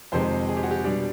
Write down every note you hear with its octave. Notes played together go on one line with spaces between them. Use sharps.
F2 C3 D#3 G#3 C5
G#4
G4
F#4
G4
B2 G3 D4